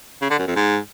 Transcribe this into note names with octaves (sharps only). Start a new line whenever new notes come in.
C#3
D3
F#2
F2
G#2